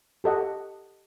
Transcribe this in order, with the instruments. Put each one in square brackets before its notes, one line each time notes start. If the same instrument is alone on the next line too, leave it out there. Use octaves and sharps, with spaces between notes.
[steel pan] G4 A4 D#5 F#5